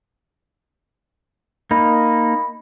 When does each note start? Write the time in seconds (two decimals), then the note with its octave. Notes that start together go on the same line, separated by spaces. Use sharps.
1.71 A#3 D#4 B5